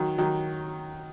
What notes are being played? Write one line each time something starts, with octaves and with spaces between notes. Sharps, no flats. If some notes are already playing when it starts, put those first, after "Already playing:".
Already playing: D#3 F#3
D#3 F#3